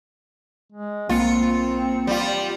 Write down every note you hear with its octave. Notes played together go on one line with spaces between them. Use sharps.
G#3
B1 A#3 C4 F4 C#7
G3 F4